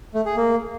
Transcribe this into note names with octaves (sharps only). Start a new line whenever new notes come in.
A3
G#4
A#3